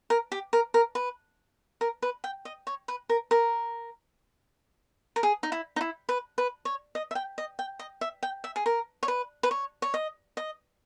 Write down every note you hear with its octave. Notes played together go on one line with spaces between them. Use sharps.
A#4
G4
A#4
A#4
B4
A#4
B4
G5
D#5
C#5
B4
A#4
A#4
A#4
G#4
D#4
E4
D#4
E4
B4
B4
C#5
D#5
E5
G5
D#5
G5
D#5
E5
G5
E5
G#4
A#4
C#5
B4
B4
C#5
C#5
D#5
D#5